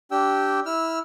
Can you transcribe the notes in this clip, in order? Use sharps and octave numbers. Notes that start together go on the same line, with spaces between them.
D4 G4 G5 E6
E4 E6 F6